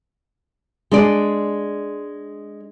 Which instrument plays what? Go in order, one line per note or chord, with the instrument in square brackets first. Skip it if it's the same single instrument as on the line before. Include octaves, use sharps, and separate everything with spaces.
[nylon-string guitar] G#3 D4 G#4 D5